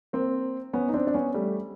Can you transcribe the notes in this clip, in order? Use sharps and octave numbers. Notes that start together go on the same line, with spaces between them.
A#3 C4
B3 C#4
D#4
C4 D4
D4
B3 C#4
G3 A3